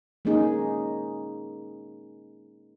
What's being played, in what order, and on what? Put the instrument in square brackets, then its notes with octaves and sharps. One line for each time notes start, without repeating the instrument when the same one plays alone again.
[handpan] G#3 A#3 C#4 D#4 G#4